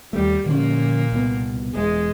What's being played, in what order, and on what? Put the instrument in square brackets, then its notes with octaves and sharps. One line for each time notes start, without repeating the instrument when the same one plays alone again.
[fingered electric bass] D#2 A3 [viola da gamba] G3
[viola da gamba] A#2 A#3 [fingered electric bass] D3 F3 C#4
[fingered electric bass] C2 B2 B3
[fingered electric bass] E1 [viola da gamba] G#3